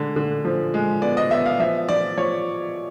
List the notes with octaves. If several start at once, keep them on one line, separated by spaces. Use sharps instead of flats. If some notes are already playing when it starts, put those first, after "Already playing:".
Already playing: D3 G#3
D3
F3
G#3
B3 D5
D#5
B3 E5
F5
F3 E5
F3 D5
F3 C#5